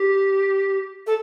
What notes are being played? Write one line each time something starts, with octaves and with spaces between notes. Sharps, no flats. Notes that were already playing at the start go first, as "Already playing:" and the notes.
Already playing: G4
A4